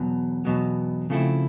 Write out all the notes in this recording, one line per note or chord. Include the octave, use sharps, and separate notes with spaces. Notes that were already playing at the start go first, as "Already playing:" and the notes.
Already playing: E2 B2 F#3
E2 B2 F#3
C#3 F3 A3 C4 E4